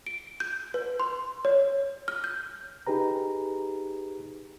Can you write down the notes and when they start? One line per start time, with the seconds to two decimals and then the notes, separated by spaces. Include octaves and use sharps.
0.07 D7
0.40 G6
0.74 B4
1.00 C6
1.45 C#5
2.08 F6
2.24 G6
2.87 D#4 G4 G#4 B4 A#5